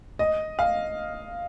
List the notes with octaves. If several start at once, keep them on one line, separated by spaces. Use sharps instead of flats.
D#5
F5